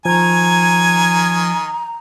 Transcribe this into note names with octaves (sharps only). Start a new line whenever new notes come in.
D#3 F3 G#5 A#5 G#6